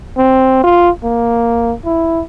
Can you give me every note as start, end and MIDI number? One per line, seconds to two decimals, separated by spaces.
0.18 0.62 60
0.64 0.89 65
1.04 1.72 58
1.85 2.22 64